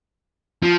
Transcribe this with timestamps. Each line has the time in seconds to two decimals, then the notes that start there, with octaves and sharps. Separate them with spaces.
0.63 F3